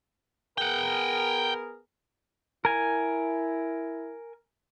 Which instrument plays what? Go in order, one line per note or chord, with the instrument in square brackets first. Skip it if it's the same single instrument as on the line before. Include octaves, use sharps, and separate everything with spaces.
[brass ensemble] B3 G#4 A#4 [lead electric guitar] F#5 G5
[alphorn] E4 [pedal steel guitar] A#4 G#5